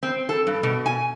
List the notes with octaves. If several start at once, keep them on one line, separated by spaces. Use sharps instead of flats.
C4
A4
G2
B2
G#5